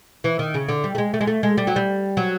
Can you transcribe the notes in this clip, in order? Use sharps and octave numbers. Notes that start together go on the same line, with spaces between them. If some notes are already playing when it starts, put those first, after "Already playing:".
E3
D#3
C#3
D3
G3
A3
G#3
A3
G#3
A3
G#3
G3
F#3
G3
F#3